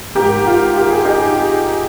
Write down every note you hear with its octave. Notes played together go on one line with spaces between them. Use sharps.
G#2 D#3 G4 A#4
F4
G4
G#4
D#4 G4